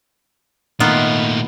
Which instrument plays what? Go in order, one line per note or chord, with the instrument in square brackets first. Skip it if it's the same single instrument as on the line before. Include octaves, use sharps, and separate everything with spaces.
[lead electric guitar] A#2 A3 [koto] D#3 B3 F4